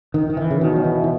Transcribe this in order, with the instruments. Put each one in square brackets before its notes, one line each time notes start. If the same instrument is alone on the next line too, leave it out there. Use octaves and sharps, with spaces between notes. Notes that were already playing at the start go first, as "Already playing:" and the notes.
[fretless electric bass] D#3
D#3
E3
C#3
[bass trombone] B2 [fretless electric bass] D#3
[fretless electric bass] F#3
E3
E3